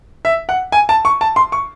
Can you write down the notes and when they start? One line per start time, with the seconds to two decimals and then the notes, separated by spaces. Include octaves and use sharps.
0.25 E5
0.49 F#5
0.72 G#5
0.89 A5
1.05 C#6
1.21 A5
1.36 C6
1.52 C#6